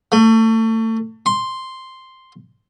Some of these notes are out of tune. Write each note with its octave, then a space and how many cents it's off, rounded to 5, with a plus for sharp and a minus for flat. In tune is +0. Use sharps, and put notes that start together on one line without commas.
A3 +30
C6 +0